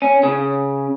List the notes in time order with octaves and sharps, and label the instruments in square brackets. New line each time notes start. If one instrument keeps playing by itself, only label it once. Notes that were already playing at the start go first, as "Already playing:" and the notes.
[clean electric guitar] C#4
C#3